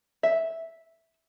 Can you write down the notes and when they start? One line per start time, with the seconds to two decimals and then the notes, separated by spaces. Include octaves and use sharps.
0.23 E5